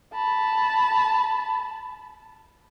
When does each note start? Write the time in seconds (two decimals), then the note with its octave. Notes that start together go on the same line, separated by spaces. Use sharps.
0.14 A5 B5